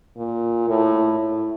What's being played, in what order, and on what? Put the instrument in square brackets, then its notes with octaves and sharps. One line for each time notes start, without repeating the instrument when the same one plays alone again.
[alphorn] A#2
A2
E4